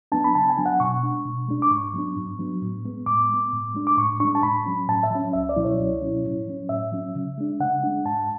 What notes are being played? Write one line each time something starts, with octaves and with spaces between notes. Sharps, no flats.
F#3 B3 D4 A5
B5
C#3 A5
G#5
F#3 B3 D4
F#5
B2 C#6
G#3 D4
B2
G#3 D4
D6
G#2 C#6
F#3 B3 D4
G#2
F#3 B3 D4
A2
G#3 B3
A2 D6
G#3 B3
A2
G#3 D4
D6
A2 C#6
G#3 D4 C#6
A5
A2 B5
F#3 C#4
A2 A5
E5
F#3 C#4
C#2 E5
D5
B2 F#3 C#4 E4
C#5
C#2
B2 F#3 C#4 E4
A2
F#3 C#4
A2 E5
F#3 C#4
C#3
G#3 D4
C#3 F#5
G#3 D4
G#2 A5